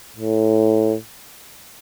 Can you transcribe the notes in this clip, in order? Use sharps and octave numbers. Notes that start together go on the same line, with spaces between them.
A2